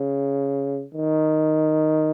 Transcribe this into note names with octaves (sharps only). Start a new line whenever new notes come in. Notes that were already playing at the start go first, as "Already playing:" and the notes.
Already playing: C#3
D#3